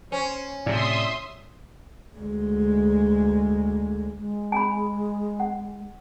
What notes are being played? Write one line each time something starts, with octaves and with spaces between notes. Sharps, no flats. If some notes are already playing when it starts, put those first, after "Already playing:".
C#4 C5
A2 C3 D5 E5 C6 D#6
D2 G#3
G#3
G#5 B5
F#5